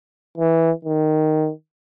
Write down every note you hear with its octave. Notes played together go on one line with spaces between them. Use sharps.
E3
D#3